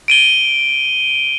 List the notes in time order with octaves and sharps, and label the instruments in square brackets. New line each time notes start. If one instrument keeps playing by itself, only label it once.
[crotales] D7 D#7 G7